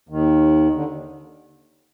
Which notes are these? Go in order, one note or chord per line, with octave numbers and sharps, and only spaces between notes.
D#2 D#3
D3